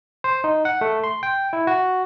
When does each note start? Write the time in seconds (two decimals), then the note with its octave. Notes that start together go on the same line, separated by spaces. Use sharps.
0.24 C5
0.44 D#4
0.65 F#5
0.81 A3
1.04 C6
1.23 G5
1.53 E4
1.67 F#4